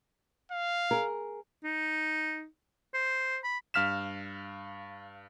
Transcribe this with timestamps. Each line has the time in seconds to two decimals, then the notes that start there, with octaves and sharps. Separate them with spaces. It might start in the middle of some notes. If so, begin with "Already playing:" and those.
0.52 F5
0.91 G#4 A#4
1.64 D#4
2.94 C5
3.44 B5
3.74 G2 F5 F6 B6 E7